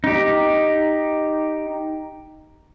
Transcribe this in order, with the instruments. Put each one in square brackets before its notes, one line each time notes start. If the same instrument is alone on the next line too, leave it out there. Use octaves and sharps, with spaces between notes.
[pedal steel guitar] D#4 G4